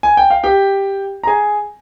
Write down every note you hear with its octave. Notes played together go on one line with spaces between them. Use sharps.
G#5
G5
F5
G4 G5
A#5
G#4 G#5